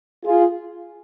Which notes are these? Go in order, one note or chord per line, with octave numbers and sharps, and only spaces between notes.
F4 G#4